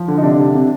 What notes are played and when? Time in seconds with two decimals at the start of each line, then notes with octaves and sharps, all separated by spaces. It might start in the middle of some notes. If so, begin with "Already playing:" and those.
Already playing: F3
0.08 D3
0.17 D#4
0.23 C3 D4
0.39 C3
0.55 C3